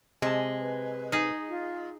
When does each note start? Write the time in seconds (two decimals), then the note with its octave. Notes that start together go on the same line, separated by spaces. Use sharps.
0.22 C3 G#3 G#5 A5
0.60 B4
1.12 D#4 G#4
1.49 F4